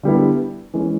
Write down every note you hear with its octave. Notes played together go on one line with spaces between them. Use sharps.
D3 G3 B3 E4
E3 G#3 C#4